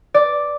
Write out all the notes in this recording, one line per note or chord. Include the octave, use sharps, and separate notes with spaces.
D5